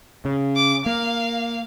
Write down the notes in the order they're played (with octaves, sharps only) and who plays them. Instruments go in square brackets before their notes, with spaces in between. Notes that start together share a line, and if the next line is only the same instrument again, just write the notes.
[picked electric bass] C#3
[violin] D6
[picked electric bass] A#3 [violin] F5